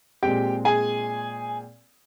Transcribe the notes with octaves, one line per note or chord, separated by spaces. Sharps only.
A#2 G#3 C4 G4 G5
G#4 G#5